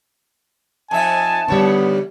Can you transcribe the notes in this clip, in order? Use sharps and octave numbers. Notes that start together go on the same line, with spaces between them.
F2 D#4 E5 G#5 A5
D#2 D3 G3 B3 C#5